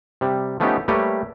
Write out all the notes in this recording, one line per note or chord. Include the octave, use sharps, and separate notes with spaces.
C3 G3
F3 A3 B3 C#4 D#4 G4
G3 A3 A#3 G4 B4 C#5